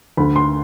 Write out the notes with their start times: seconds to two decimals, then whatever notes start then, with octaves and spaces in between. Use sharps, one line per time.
0.17 D2 D3 B5
0.36 C6